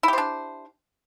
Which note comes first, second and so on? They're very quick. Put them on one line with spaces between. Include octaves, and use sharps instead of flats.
E4 G4 C5 D4